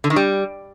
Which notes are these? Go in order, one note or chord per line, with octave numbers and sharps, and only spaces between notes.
D3
D#3
G3